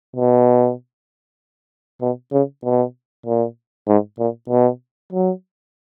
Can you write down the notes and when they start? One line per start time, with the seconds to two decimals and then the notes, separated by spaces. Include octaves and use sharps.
0.16 B2
2.01 B2
2.32 C#3
2.64 B2
3.26 A#2
3.88 G#2
4.18 A#2
4.49 B2
5.12 F#3